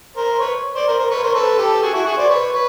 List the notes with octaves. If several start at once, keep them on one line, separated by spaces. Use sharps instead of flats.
A#4 C5
B4 C#5
C5 D5
A#4 C5
A#4 C5
B4 C#5
A#4 C5
A4 B4
G4 A4
F#4 G#4
E4 F#4
F#4 G#4
C5 D5
B4 C#5
B4